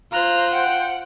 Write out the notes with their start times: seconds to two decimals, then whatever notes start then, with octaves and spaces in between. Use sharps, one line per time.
0.12 F4 C5 A#5 F#6
0.53 F#5 G5